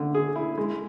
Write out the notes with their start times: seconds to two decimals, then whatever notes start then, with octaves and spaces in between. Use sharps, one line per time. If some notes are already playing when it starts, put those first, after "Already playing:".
Already playing: D3 A3
0.15 G#4
0.36 E4
0.58 G#3